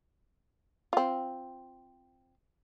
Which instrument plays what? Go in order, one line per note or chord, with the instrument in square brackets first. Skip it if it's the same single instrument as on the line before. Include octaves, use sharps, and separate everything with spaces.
[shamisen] C4 F4